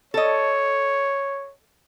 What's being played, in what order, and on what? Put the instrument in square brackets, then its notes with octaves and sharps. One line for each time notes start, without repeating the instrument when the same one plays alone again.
[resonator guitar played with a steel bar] A4 D#5 [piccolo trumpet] C#5